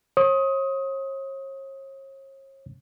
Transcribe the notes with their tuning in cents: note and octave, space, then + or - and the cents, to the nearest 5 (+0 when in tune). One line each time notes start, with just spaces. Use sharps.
C#5 -40 D#6 +20